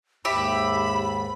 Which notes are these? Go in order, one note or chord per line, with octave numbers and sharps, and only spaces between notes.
D#2 G#2 G4 E5 B5